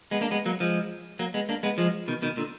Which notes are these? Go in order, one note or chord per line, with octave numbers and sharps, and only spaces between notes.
G#3 B3
A#3 D4
G#3 B3
F#3 A#3
F3 G#3
F#3 A#3
G#3 B3
A#3 D4
G#3 B3
F3 G#3
B2 D#3
B2 D#3
A#2 D3